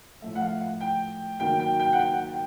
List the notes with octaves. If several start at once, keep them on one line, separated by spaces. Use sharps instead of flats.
A2 F3 A3 E5
F#5
F5
F#5
G5
D#3 F#3 A#3 G5
G5
G5
F#5
G5
F#5
G5